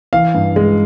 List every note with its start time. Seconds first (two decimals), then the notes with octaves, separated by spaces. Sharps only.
0.13 E3 F5
0.34 G2
0.56 G#3